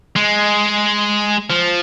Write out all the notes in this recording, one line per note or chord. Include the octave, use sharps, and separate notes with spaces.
G#3
F3